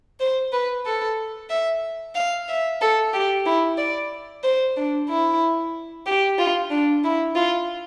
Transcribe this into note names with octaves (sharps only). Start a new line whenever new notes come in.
C5
B4
A4
E5
F5
E5
A4
G4
E4
D5
C5
D4
E4
G4
F4
D4
E4
F4